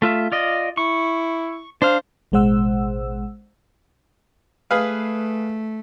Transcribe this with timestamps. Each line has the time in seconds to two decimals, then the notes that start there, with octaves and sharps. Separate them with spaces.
0.02 A3 F4 E5
0.32 F4 D5 D#5
0.77 E4 C#6
1.82 D4 C5 F5
2.32 A1 B2 G#3 C5 F#5 E6
4.71 A3 G#4 B4 F5